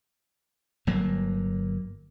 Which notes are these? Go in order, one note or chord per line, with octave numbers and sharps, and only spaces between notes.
G1 F#3 A#3